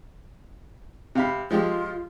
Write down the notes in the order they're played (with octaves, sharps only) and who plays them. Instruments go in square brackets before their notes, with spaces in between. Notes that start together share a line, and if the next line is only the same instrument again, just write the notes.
[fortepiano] C3 F5 B5
[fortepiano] F3 G#3 G4 [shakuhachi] F4